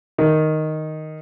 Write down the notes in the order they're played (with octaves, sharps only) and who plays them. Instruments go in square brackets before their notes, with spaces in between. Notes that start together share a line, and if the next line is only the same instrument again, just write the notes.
[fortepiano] D#3